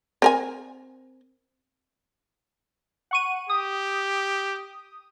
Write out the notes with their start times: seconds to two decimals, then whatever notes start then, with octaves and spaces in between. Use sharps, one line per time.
0.22 C4 A#4 G#5
3.11 F#5 C#6 D#7
3.50 G4 D#6